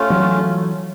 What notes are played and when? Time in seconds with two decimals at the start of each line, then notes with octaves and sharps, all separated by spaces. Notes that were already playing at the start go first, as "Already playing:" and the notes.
Already playing: A3 C#4 F4
0.10 E3 F#3